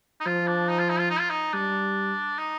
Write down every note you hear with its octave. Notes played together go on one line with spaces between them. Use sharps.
D#4
F3 F4
D4
D#4
F4
D#4
F4
D#4
F4
D#4
G3 D4
D#4